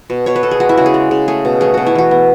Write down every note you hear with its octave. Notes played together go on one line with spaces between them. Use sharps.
B2
B2 C#5
B4
B2 A4
G#4
G#3 F#4
E4
C#3 F#4
G#4
G#3
C#3
A3 G#4
B2
A3 G#4
B2 F#4
E4
E3 F#4
B3